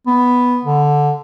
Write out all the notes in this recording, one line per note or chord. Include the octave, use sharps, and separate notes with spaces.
B3
D3